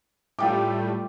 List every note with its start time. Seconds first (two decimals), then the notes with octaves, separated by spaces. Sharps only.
0.39 A2 G3 A3 F4 G5 D6